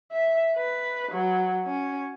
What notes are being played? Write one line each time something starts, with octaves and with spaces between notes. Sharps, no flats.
E5
B4
F#3
C#4